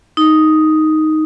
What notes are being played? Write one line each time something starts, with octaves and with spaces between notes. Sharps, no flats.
D#4